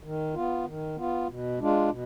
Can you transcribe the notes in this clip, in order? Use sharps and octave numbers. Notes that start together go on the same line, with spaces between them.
D#3
B3 F4
D#3
B3 F4
B2
G#3 D4 F4
B2